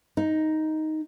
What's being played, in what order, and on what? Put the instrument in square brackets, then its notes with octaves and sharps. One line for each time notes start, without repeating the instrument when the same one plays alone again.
[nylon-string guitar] D#4